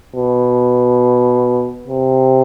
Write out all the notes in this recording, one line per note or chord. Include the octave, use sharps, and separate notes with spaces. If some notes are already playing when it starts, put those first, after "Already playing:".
B2
C3